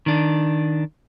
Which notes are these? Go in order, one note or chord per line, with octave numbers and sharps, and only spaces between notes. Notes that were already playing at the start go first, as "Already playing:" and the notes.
D#3 D4